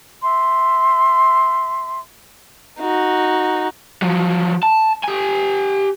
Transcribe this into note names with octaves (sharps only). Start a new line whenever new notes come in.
E5 C6
D#4 F#4
F3 F#3
A5
G4 G#5